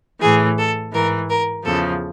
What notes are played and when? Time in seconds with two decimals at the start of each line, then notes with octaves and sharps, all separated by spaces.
0.21 A2 E3 G#4
0.58 A4
0.93 G#2 E3 A#4
1.29 A#4
1.65 E2 C#3 F3 A4